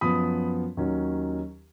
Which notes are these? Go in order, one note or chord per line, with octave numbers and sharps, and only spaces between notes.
F#2 F3 B3 B5 D#6
D#2 D#3 F#3 C#4